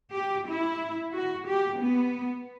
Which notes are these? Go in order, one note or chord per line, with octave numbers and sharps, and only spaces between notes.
G4
E4
F#4
G4
B3